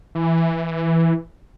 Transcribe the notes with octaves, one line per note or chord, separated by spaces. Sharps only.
E3